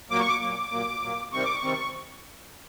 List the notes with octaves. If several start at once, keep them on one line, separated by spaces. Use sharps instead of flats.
A#2 F#3 A#3 D6
C#6
D6
A#2 F#3 A#3 D6
A#2 F#3 A#3
A#2 F#3 A#3
C3 D#3 G3 C4 C#6
D6
C#6
C3 D#3 G3 C4